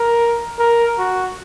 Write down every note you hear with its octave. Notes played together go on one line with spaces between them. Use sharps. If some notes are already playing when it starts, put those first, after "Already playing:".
Already playing: A#4
A#4
F#4